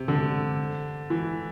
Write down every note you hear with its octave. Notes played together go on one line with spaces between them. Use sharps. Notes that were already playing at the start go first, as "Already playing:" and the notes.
Already playing: C3
D3
E3